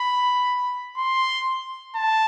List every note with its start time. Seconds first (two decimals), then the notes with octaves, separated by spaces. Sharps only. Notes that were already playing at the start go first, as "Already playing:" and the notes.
Already playing: B5
0.97 C6
1.95 A5